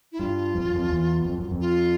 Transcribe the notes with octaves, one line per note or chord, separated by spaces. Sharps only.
E4
G2 F4
F2
F#2
F2
E2
F2
F#2
F2
F4